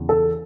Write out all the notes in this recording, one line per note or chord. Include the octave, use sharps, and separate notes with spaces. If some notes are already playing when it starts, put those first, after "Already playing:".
Already playing: E2 C#3 E3
A4